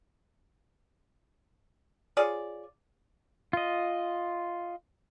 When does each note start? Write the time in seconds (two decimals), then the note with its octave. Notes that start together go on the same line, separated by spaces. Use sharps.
2.17 F4 G#4 C#5 D5
3.53 F4 D#5